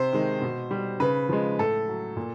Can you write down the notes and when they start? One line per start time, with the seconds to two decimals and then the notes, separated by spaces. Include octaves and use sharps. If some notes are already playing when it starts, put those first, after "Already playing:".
Already playing: C3 C5
0.13 D#3 G#3
0.42 B2
0.71 G3
1.00 C#3 B4
1.29 F3 G#3
1.59 A2 A4
1.88 F#3
2.16 A#2